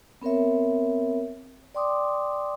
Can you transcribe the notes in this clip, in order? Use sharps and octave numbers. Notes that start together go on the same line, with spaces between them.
B3 C4 A#4 C#5 E5
D5 G5 C6 D6 D#6